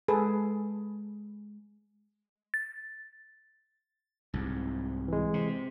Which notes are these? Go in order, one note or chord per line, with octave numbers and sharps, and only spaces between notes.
G#3 G#4 A4 B4 G#5 B5
A6
C2 G#2
E3 G#3
C3